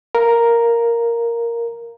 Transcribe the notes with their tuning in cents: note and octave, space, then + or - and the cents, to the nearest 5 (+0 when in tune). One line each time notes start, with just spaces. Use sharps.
A#4 +0 F5 -10